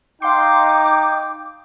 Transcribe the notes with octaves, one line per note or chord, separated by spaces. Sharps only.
D#4 F5 G5 C6 D6